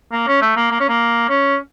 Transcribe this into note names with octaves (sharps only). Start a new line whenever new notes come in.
A#3
C#4
A3
A#3
A#3
C#4
A#3
C#4